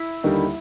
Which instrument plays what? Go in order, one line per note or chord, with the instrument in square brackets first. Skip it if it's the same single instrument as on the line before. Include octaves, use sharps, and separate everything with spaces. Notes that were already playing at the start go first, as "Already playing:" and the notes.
Already playing: [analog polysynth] E4
[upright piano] D#2 D3 G3 A#3 D#4